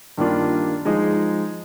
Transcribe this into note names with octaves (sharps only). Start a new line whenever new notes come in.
G2 D#3 A#3 D4 F4
F3 G#3 D#4 G#4